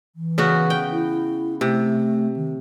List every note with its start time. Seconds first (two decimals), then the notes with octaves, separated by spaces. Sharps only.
0.16 E3
0.38 C#3 B3 F#4
0.70 G5
0.91 E4
1.61 C3 A3
2.36 D#3